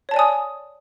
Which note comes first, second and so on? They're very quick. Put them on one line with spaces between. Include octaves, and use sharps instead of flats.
C#5 A5 D5 G#5 D#6